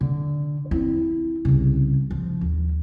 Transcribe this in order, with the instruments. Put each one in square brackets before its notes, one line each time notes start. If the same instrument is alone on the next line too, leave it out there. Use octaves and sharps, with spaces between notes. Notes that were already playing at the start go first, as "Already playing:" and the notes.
[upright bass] D3
C4 E4
C2 C#3
F3
D#2